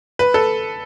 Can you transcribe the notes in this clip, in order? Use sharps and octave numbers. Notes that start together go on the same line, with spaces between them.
B4
A4